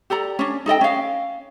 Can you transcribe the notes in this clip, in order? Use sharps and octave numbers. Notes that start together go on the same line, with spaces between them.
G4 A4 D5 A#5
C#4 D4
D#4 A4 D#5 G5
C#4 F5